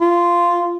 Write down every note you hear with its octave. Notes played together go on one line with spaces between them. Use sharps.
F4